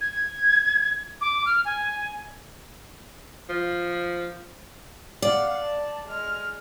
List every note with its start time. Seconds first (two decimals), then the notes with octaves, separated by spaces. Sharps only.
0.01 G#6
1.21 D6
1.46 F6
1.65 G#5
3.49 F3
5.22 D5 F5 F#5
5.63 A5
6.06 G#3 F6